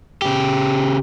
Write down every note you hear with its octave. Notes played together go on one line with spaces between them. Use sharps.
C#3 G4